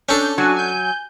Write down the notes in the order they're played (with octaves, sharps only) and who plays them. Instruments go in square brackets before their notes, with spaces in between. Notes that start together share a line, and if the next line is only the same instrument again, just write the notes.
[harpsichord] C#4 A4 [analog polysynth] D4 G6
[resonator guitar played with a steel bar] F#3 [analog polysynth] D4 F#4 G#5
[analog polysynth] G#5 G6